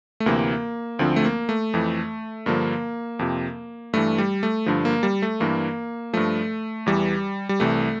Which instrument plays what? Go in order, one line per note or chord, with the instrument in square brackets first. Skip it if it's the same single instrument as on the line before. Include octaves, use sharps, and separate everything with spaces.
[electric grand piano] A3
D2 C3 E3 A#3
D2 D3 F3 C4
A3
A#3
A3
F2 E3
G2 D3 F3 A#3
F2 C3 F3
G2 E3 A3
G3
A3
G2 D3 F3
A#3
G3
A3
G2 E3 A#3
G2 F3 A3
E2 E3 G3
G3
C2 C3 E3 A3